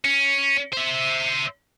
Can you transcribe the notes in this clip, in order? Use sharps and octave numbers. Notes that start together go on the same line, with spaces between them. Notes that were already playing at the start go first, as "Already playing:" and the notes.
C#4
C5 E5